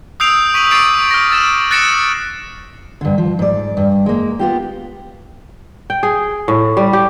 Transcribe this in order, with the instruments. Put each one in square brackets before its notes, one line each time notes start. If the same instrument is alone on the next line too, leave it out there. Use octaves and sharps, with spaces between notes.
[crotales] D#6 E6 G6 C7 D7 F7
C#6 B6 D7 D#7 F#7
C#6 D6 A6 C7 D7 F7
F6 A#6
E6 A6 E7
F#6 A6 A#6 C#7 D7 E7
[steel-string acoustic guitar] G2 D3
F3
G#2 D5
G2
G#3 A#3
B3 F4 G4
[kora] G5
G#4
A2
G3
G4